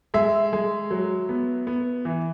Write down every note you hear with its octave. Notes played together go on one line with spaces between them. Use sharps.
G#3 E5
G#3
F#3
B3
B3
E3